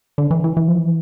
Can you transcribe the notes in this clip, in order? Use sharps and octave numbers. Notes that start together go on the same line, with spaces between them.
D3
E3
E3
E3
F3
E3